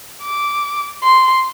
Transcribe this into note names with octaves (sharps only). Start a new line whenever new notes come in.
D6
C6